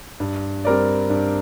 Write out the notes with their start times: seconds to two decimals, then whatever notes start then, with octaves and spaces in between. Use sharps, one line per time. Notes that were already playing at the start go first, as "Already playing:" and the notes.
0.20 G2
0.65 G3 C4 A#4 D5
1.10 G2